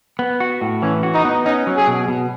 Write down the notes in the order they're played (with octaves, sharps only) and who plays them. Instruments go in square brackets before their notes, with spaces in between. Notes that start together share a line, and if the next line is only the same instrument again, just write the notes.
[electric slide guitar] B3
F#4
A2
[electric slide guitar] E3 [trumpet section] C#4
[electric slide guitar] F#4
[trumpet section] D#4
[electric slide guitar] B3
[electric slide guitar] C#4 [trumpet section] D#4
[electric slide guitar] F#3
[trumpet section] G#4
[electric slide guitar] B2
B2